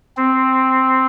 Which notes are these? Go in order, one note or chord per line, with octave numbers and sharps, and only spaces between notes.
C4